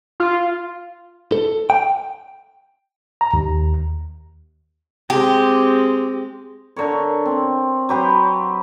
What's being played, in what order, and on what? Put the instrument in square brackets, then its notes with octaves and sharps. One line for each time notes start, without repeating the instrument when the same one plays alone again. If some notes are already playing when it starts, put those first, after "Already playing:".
[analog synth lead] F4
[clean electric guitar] A4
G5
[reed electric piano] A#5
D#2
[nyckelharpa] G#3 C4 [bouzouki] G4
[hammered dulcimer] D3 A#4 C#5
C4
F#3 G4 B4 C5